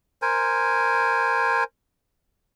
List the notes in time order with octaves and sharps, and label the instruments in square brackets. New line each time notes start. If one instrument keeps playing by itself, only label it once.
[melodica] A#4 C5 G#5